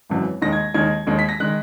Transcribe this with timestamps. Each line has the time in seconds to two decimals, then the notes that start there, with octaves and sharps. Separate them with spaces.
0.09 G#1 F#2 E3
0.42 D#2 D#3 G#3 A#6
0.52 G#6
0.74 D#2 D#3 G#3 G#6
1.07 D#2 D#3 G#3
1.19 B6
1.29 A#6
1.40 D#3 G#3 F#6